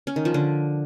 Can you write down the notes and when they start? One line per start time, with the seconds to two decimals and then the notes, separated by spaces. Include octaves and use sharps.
0.07 C#4
0.16 D#3
0.25 F3
0.34 D3